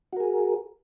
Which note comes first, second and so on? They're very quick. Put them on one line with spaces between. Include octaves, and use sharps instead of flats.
F#4 A#4 G#4